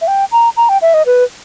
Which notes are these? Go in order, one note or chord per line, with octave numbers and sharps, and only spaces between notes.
E5
G5
A#5
A#5
G5
E5
D#5
B4